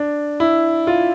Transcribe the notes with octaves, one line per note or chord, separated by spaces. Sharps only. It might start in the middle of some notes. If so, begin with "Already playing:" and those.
Already playing: D4
E4
F4